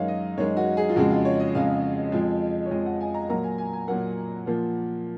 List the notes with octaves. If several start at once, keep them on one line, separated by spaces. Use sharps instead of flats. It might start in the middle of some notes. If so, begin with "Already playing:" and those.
Already playing: F#2 D#3 G#3 C#5 F5
D#5
F#2 D#3 G#3 C#5
F#4
G#4
F4
F2 C#3 G#3 F#4
F4
C#5
D#5
F2 C#3 G#3 F5
F2 F3 G#3
C#5
F2 F3 G#3 D#5
F#5
G#5
A#5
A#2 F#3 A#3 A#5
G#5
G#5
G#5
A#2 F#3 A#3 F#5
A#2 F3 A#3